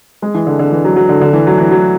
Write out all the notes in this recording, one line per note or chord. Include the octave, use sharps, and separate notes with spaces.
G#3
E3
D3
D3
E3
F#3
F#3
D3
D3
E3
F#3
E3
F#3